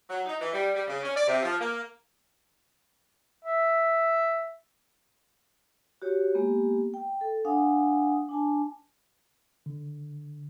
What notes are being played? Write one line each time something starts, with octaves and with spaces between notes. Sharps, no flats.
F#3
D#4
E3
G3
G3
C#3
C#4
D5
C3
F3
A#3
E5
F#4 G4 C#5
G#3 A#3 B3 G4
G5
A4
D4 F5 F#5 G#5 D#6
D4 G#5 A5
D3